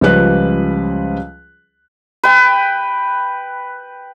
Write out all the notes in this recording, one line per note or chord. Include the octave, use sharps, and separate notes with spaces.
C#2 F3 G3 C#4 B4 F#6
B4 G5